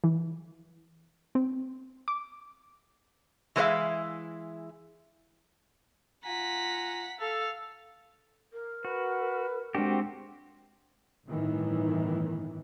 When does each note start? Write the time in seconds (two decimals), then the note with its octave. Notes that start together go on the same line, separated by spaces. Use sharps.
0.04 E3
1.35 C4
2.08 D6
3.56 E3 G#3 E4 C5 E5 F5
6.25 F4 F#5 G#5 A#5 B6
7.20 A4 F5
8.53 A#4
8.85 F#4 B4
9.75 G#3 C4 D4 F#4 G4
11.27 G1 A2 D#3 E3